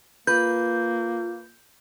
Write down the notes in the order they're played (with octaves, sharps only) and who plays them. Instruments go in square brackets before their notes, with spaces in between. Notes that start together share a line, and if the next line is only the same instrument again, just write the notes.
[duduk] A#3 [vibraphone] F4 [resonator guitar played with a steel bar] B4 [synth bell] G6